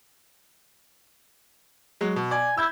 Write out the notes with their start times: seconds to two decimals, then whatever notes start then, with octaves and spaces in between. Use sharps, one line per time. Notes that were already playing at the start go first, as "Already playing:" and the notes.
2.01 F#3 G#3
2.16 B2
2.31 D5 G#5
2.57 E4 E6 G6 G#6